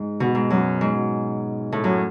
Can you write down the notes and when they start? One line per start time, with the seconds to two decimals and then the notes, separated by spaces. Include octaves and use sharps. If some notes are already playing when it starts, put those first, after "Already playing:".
Already playing: G#2
0.20 B2
0.35 G#2
0.50 F#2
0.81 G#2
1.72 A2
1.84 F#2